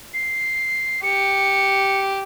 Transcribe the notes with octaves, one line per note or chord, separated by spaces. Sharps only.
C7
G4 C#7